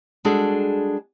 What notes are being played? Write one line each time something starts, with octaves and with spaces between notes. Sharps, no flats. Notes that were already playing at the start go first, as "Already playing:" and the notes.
G3 G#3 D4 F#4 G#4 A4